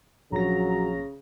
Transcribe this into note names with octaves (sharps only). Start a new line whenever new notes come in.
A#1 C#3 F#3 A#5 A#6